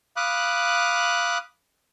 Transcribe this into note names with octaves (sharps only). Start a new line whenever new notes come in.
F5 B5 D6 D#6 F#6